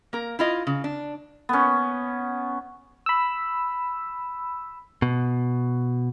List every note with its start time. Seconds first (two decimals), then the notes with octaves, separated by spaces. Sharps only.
0.13 A#3 A#4
0.39 E4 F4 D#5
0.67 C#3
0.84 D4
1.49 B3 C#4
3.06 B5 E6
5.02 B2